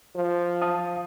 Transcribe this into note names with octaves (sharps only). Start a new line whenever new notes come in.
F3
F5 A5 D#6